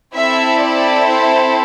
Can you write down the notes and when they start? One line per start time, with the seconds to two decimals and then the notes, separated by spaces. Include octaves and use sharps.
0.15 C4 E4 A4 E5
0.60 D5
1.06 C5